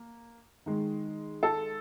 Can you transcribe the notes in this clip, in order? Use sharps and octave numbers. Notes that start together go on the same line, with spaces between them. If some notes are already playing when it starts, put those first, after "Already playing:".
Already playing: A#3
D#3 G#3
A4